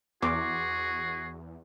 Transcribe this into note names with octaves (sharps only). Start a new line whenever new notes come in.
E2 F#4 G#4 C6 D6